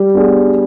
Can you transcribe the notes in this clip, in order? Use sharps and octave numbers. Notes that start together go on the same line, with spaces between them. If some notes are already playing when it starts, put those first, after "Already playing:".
Already playing: G3
B3 D4 G#4